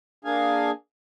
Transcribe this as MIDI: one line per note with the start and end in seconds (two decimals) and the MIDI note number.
0.25 0.71 58
0.25 0.71 62
0.25 0.71 68
0.25 0.71 77
0.25 0.71 80